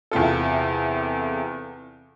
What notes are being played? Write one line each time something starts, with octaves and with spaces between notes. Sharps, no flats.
E2 C3 F4 A4